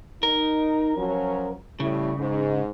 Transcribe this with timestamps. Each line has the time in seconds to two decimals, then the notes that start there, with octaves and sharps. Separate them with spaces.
0.23 D#4 A#4
0.96 F3 F#3 C#4
1.80 A2 C#3 G3 E4
2.18 G#2